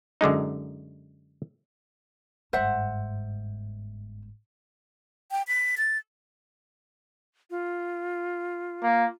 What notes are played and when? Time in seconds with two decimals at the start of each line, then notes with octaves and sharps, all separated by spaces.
0.21 F#2 D3 G#3 D#4
2.53 G1 G#2 C5 E5 F#5
5.31 G5
5.48 B6
5.78 A6
7.50 F4
8.83 A#3